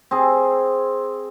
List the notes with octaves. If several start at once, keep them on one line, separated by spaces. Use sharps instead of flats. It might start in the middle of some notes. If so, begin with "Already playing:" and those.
C4 G#4